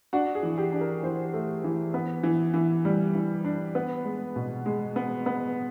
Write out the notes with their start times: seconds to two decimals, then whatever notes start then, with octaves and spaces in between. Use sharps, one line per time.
0.13 D4 F#4
0.35 G#4
0.43 E3
0.58 G4
0.73 D4
0.81 A#4
1.03 E3 C5
1.34 A3
1.64 E3
1.94 B3
2.23 E3
2.54 E3
2.85 G3
3.15 E3
3.45 D4
3.75 B3 B4
4.05 G#3
4.36 B2
4.66 G#3
4.96 B3
5.26 B3